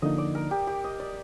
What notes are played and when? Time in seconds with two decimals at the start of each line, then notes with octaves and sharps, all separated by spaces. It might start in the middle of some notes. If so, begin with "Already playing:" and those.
0.02 D3 F3 A#3 D#4 D#5
0.18 D5
0.35 A#4
0.51 G4
0.67 G4
0.84 D#5
0.99 D5